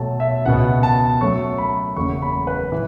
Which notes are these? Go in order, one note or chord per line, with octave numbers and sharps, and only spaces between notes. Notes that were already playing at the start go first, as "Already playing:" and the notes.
Already playing: B1 B2 F#3 A3 A5
E5
C#2 B2 B3 F#5
A5
F#2 F#3 A3 C#6
B5
F#1 E2 C#3 A3 C#6
B5
B4
E3